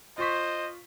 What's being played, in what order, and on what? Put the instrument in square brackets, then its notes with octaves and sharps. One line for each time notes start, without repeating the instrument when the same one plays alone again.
[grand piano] F4 C#6 B6 [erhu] C5 [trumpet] D#5